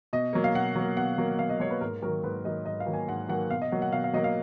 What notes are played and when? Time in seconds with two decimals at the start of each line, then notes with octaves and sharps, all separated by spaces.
0.13 B2 D#5
0.33 F#3 A#3
0.44 F5
0.54 B2 F#5
0.76 F#3 A#3
0.97 B2 F#5
1.18 F#3 A#3
1.39 B2 F5
1.49 D#5
1.60 F#3 C#5
1.65 A#3
1.70 B4
1.81 G#2 A#4
2.02 D#3 F#3 A#3 A#4
2.23 G#2 B4
2.45 D#3 F#3 A#3 D#5
2.65 G#2 D#5
2.80 F5
2.87 D#3 F#3 A#3
2.94 G#5
3.08 G#2 F#5
3.29 D#3 F#3 A#3 F#5
3.50 B2 F5
3.62 D#5
3.72 F#3 A#3 F#5
3.82 F#5
3.92 B2 F5
4.04 F5
4.13 F#3 A#3 D#5
4.24 F5